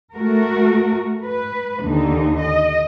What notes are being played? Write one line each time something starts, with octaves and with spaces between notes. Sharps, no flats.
A3 F#4 A#4
B4
D#2 D3 D#4
D#5